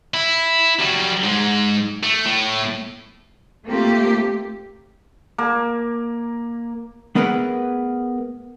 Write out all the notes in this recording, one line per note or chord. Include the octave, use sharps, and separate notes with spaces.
E4
F#3 G3
G#2 G#3
A3
A2 A3
A3 A#3 C4 F4 G4
A#3
A3 B3 G#4 A#4 B4 F#5